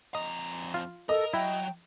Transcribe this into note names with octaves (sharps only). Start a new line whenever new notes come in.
F2 D#5 A#5
F4
A4 A#4 D#5
F#3 E4 G5